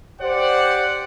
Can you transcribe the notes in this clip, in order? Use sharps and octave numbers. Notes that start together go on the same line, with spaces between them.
G4 C5 D5 F#5